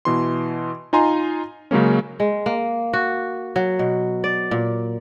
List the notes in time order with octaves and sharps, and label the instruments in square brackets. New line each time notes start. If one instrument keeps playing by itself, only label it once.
[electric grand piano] B2 E3 C6
D#4 F4 G#5 A#5 C6
C#3 F#3 G#3 A#3 C#4
[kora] G#3
A#3
F#4
F#3
B2
D5
A#2